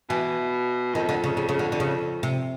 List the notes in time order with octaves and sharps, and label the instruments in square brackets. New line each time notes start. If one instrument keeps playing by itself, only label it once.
[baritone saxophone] B2 [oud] E3
[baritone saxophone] F2 [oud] D#3
[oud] D3
C#3
C#3
C#3
D3
D3
C#3
C3